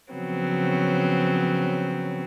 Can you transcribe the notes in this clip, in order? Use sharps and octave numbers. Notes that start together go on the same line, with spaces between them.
C#3 F3 F#3 B3 C4